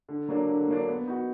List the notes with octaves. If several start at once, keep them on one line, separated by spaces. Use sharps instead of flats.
D3
F#3 A#3 D4
D3
F#3 A#3 D4
B3
D#4 F#4